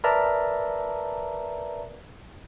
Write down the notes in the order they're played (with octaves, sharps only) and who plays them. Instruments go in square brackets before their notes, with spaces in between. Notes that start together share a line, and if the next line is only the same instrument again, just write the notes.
[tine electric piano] A#4 B4 D5 E5 A5 A#5